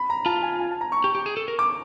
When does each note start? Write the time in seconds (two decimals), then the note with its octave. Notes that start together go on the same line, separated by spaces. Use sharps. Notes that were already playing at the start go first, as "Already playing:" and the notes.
Already playing: B5
0.10 A#5
0.26 F4 A5
0.42 G#5
0.60 G#5
0.71 A5
0.81 A#5
0.92 C#6
1.04 G4
1.15 G4
1.26 G#4
1.37 A4
1.48 A#4
1.59 D6